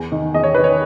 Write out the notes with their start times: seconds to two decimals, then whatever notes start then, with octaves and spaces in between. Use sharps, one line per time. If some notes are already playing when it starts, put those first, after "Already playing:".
Already playing: E2
0.12 D#3
0.34 E2 D#5
0.43 C#5
0.55 D#3 B4
0.64 C#5